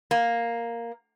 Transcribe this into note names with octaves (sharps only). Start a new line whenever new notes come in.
A#3